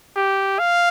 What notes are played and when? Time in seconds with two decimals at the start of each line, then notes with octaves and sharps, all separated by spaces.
0.16 G4
0.59 F5